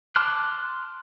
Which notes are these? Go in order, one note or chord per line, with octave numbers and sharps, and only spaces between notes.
A5 C6 D6 F6 F#6